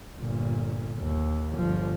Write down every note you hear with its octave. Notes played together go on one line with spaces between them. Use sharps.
G1 A#2
D#2
G1 F3